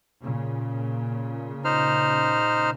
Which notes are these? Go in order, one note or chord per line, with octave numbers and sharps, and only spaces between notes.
A#2 C#3
D#4 C5 F6